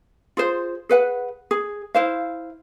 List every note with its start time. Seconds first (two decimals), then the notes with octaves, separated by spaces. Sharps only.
0.37 F4 G#4 C5
0.89 G#4 B4 F#5
1.51 G#4
1.95 E4 C5 F5